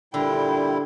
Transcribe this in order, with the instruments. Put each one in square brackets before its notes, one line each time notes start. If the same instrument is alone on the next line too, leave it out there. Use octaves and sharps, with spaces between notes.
[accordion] A#2 G3 E4 [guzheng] D3 [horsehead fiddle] G5